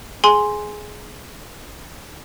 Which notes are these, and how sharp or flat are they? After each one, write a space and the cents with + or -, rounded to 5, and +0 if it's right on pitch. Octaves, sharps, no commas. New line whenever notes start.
G#4 +15 G#5 +0 C6 +0